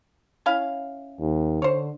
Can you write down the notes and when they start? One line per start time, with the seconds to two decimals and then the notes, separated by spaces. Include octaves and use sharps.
0.46 C#4 E4 F5
1.19 D#2
1.62 D3 C5 C#5